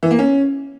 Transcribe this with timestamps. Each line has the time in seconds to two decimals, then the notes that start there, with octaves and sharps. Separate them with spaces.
0.03 E3
0.11 A#3
0.19 C#4